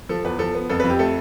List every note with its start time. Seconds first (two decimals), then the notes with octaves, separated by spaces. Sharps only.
0.09 F3 A4
0.24 E2 B4
0.39 F3 A4
0.55 B3
0.70 F2 A4
0.80 F2 B4
0.90 G4
0.99 A3 A4